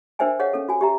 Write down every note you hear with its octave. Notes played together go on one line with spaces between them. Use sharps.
D4 A#4 C5 E5 G5 G#5
G#4 C#5 D#5 F5 F#5
C#4 A4
F#4 G#5
G4 E5 A#5